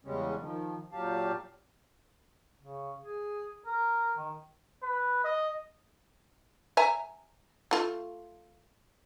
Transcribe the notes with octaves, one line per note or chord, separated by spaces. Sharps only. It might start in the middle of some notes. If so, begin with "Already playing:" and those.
E2 C#3 G3 G#3 C#4
D#3 F3
A#2 F#3 G4 F5 A5
C#3
G#4
A#4
D#3
B4
D#5
E5 G#5 A#5
A3 F4